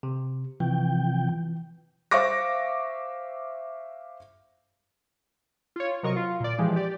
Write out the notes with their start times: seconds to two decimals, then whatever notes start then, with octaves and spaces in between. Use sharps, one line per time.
0.03 C3
0.60 C3 E3 F3 G5
2.11 C5 E5 F5 C#6 D6 A#6
5.76 F4 C#5
6.03 C3 F#3 A#4 D#5 C#6
6.16 F4
6.40 A#2 D5
6.58 E3 F3 G#3 G4
6.76 G4 D5